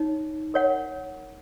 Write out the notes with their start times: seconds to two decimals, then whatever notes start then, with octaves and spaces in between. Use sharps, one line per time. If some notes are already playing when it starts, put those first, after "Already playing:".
Already playing: D#4 C#5
0.54 A#4 C#5 F#5